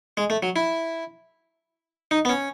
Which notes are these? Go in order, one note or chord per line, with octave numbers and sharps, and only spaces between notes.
G#3
A3
F#3
E4
D#4
B3
C#4